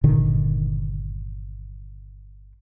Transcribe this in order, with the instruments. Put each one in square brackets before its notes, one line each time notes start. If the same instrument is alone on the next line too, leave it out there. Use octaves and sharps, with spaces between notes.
[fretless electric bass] G1 A#2 D3 D#3